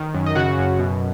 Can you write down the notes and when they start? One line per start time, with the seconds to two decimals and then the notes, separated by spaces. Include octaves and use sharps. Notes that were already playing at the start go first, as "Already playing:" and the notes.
Already playing: D#3
0.15 F#2
0.26 D#5
0.35 C#3 F#4 F#5
0.58 F#2
0.79 B2